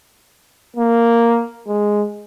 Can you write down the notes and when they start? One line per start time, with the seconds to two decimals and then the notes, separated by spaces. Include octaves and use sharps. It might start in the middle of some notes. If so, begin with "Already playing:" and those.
0.77 A#3
1.68 G#3